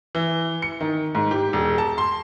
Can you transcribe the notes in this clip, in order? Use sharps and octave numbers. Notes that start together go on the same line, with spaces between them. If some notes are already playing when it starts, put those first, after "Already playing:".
E3
C#7
D#3
G#2
G4
E1
A5
C6